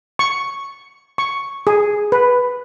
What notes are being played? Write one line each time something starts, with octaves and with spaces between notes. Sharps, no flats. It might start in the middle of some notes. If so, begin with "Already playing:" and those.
C#6
C#6
G#4
B4